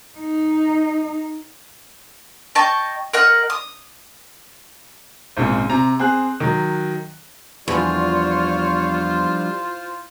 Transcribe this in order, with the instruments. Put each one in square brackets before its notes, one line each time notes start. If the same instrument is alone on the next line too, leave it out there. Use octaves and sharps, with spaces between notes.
[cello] D#4
[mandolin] D#5 G5 A5 C#6
A#4 D#5 F#5
D#6
[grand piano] G#1 A#2 C#3 G#3 C4
C3 A#5
C4 G#4 F#6
D#3 F#3
[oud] E2 [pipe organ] F3 G3 D4 [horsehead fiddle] F4 C5 [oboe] C#5